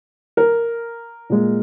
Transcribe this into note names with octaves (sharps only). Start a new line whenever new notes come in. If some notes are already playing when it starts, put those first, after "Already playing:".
A#4
A#2 G#3